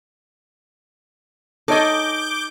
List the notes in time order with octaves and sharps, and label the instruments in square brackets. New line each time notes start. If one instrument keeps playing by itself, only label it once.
[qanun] D#4 G#5 [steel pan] A4 C#5 D#5 [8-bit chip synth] D6 G6